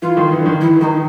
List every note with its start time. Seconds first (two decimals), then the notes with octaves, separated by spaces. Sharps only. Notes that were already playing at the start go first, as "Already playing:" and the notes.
0.02 E3 F4
0.17 D#3
0.32 E3
0.39 D3
0.46 D#3
0.61 E3 E4
0.81 D#3 D#4